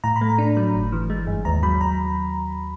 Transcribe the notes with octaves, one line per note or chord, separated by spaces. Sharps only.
A2 A#5
B5
A3
A#5
D4
F#3
G1
E3
G#3
G2
D#2 A#5
F#3 B5
A#5